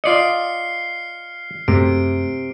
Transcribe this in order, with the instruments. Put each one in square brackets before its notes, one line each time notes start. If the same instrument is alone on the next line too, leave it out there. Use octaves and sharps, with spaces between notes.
[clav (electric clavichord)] F4 D5 D#5 [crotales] F6 C7 C#7
[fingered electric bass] F#2 A3 [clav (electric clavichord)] C3 [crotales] D7